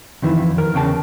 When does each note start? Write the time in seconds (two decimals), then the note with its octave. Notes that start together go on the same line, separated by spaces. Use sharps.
0.22 F2 D#3 E3
0.58 A#4
0.74 E2 C#3 G5 A5